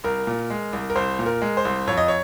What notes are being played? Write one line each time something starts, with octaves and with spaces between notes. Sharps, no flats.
C2 A#4
A#2
G#3
C2
A#4
C2 C5
A#2
A#4
G#3
C5
C2
F2 C#5
D#5
C#5